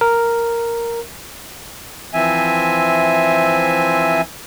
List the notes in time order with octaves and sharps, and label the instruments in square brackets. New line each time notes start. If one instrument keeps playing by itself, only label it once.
[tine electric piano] A#4
[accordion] E3 F3 C4 E5 G#5